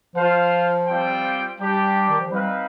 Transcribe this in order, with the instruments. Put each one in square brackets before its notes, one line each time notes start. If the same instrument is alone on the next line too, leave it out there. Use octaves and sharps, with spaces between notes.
[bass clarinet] F3 [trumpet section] F4 C5 F5
[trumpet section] G3 C4 F4 C5 G5
[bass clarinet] G3 [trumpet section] D4 G4 D5 G5
[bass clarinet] D#3
F3
[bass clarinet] G3 [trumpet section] C4 D#4 B4 F5